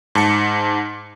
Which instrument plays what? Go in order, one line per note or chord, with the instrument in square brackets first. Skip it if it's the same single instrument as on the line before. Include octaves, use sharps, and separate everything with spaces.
[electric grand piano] G#2 A5 C#7